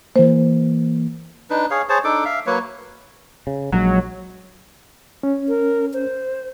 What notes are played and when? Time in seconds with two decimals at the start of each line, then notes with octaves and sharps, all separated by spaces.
0.16 E3 A#3 C5
1.50 D4 D#4 B4
1.71 G#4 C#5 F5
1.89 G#4 C5 C#5 A5
2.04 D4 D#4 A4 D6
2.25 E5 F5
2.47 F#3 A#3 B4 C#5
3.47 C#3
3.72 A#1 D3 F#3 G#3
5.23 C#4
5.48 A#4
5.93 C5